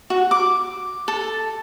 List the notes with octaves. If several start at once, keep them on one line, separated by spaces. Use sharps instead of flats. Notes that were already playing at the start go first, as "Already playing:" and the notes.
F#4
D6
A4